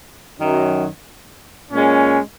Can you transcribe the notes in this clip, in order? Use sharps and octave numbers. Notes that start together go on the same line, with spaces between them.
F#2 D#3 F#3
A#2 G#3 C#4